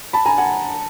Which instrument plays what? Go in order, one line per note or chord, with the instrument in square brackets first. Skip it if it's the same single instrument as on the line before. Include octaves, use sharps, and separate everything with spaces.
[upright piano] A5 B5
G#5 A#5
F#5 G#5